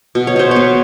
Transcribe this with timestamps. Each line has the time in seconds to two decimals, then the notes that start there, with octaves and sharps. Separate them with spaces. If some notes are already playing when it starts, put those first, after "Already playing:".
0.15 B2
0.27 C#5
0.36 B2 C5
0.51 C#5
0.56 B3